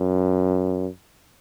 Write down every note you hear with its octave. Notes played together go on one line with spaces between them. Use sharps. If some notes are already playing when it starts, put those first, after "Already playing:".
Already playing: F#2